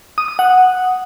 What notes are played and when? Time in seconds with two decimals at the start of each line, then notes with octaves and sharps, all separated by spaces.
0.18 D#6
0.28 D#6
0.39 F#5